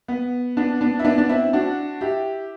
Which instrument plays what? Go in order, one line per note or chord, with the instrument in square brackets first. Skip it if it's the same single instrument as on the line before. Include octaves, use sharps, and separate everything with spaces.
[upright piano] B3
B3 D4
B3 D4
E4
B3 D4
D4
C4 E4
D4 F#4
E4 G4